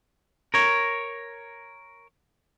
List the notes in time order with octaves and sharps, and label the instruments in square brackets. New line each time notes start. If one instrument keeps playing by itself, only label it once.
[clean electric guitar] A#4 C#5